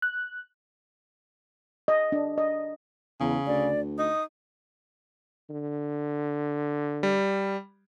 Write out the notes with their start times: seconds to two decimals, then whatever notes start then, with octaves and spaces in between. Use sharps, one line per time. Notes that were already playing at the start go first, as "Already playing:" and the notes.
0.02 F#6
1.88 D#5
2.12 D4
2.38 D#5
3.20 E2 C#3
3.47 D2 D5
3.99 D#4 D#6
5.50 D3
7.03 G3